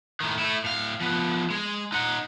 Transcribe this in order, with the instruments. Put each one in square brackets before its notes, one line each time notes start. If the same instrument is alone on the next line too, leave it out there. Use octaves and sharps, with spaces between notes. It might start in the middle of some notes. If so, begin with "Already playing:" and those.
[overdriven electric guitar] A2 D#3
A3 E4
A2 F5
F3 B3
G#3
D#4 F#5